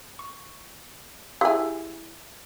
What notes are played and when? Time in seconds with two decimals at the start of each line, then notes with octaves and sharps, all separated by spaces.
0.19 C#6
1.41 E4 G4 G#4 G#5